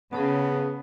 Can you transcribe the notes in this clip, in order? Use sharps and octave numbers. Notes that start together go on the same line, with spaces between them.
C#3 B3 G#4 C#5 A5